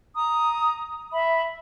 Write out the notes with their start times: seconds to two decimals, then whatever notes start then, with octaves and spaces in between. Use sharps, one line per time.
0.17 A#5 D#6
1.13 E5 B5